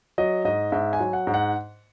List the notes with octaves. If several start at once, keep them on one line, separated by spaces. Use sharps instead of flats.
F#3 D#5
G#2 D#5
G#2 E5
G#5
F#3
F#5
G#2
F#5